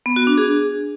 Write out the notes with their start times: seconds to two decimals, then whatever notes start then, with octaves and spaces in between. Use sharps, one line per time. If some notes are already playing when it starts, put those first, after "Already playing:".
0.06 B3
0.16 F#4
0.27 D4
0.38 G#4